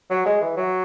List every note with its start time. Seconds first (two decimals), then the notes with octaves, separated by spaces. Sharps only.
0.10 F#3
0.26 G#3
0.41 E3
0.57 F#3